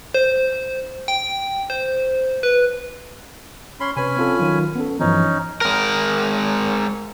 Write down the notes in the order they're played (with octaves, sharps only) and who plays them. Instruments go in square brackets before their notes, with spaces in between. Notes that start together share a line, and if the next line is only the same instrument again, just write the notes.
[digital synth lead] C5
G5
C5
B4
[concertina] C#4 B5 C6
[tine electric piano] C3 B4 [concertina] C#4 G#5 B5
[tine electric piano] C4 F4 A4
D#3 F#3 F4
B3 C#4 A4
[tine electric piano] G2 E3 F3 [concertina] C#4 D#4
[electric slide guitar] G#3 A#4